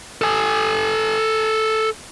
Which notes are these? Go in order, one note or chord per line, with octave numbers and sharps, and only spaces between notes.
A4 G#5